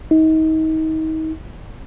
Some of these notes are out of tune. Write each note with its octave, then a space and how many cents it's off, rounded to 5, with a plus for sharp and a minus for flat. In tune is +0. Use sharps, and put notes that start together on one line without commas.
D#4 +30